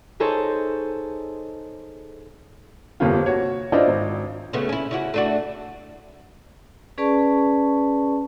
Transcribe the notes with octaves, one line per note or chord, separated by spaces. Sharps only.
D#4 G#4 A4 C5 C#5 A5
G1 C2 F2 A#3 F4
F#4 C#5
D4 E4 F4 C5 D5 D#5
G#1
C#3 A3 B3
C#4 E4
C#3 E4 F#4
A3 D4 F#4
C#4 G#4 B4 D5 A5 C#6